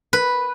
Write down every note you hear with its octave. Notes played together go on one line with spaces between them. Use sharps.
B4